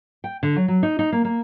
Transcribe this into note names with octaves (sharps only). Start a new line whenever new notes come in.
G5
D3
F#3
F#3
D#4
D#4
A#3
A#3